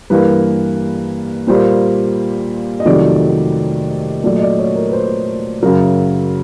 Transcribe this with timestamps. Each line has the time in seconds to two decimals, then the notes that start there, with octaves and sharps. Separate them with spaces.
0.10 G2 E3 G3 A#3 B4
1.47 A#2 G3 A#3 C5
2.80 D#5
2.85 F2 C3 D#3 F#3 A3 D5
4.24 A#2 F#3 A3 D5
4.36 D#5
4.42 D5
4.59 C#5
4.76 A#4
4.88 B4
4.93 C5
5.63 F#2 C#3 F#3 A#4